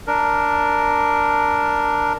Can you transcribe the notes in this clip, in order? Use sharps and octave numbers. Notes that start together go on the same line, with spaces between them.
D4 A#4